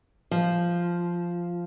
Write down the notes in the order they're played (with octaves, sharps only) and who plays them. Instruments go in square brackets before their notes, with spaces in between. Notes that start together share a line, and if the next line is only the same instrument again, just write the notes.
[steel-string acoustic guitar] F3